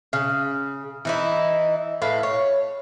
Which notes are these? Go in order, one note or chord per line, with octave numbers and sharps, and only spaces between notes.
C#3
E3 D#4 E4
A2 B4 F5
C#5